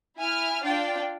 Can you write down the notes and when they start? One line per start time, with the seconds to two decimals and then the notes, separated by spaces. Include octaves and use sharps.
0.18 E4 G#5 F6
0.63 D4 F4 D5 G5